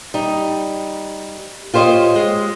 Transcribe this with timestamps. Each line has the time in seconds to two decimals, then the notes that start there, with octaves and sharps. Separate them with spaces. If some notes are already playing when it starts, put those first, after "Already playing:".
0.14 G3 D#4
1.74 F4 G4 C5 C#5 D#5
2.16 G#3